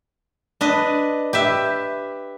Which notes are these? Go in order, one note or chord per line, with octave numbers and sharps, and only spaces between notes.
D4 B4 D#5
G4 B4 E5